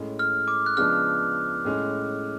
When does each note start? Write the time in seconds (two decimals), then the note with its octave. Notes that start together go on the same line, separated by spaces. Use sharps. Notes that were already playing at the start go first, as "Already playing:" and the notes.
Already playing: A2 G#3 C#4
0.19 F6
0.48 D6
0.66 F#6
0.77 C#3 F3 G#3 B3 D4 F6
1.65 A2 G#3 C#4